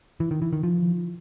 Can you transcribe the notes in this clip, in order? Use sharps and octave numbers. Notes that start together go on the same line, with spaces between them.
E3
D#3
E3
D#3
F3